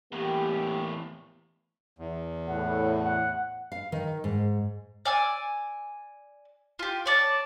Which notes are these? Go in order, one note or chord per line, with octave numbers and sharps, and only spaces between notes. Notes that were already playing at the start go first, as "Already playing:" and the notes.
E2 A2 A#3 G4
E2
A2 F#5
F#5
F5
D#3
G#2
D5 G#5 E6
F4 G4
C#5 D5 A5